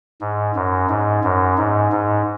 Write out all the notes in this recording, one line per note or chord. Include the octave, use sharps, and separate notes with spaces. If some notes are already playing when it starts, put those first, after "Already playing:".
G#2
F#2
G#2
F#2
G#2
G#2